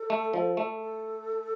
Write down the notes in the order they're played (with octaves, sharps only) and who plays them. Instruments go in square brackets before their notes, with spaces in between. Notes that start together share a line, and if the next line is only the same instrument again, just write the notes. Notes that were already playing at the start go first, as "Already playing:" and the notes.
Already playing: [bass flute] A4
[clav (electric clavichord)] A3
F3
A3
[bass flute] A4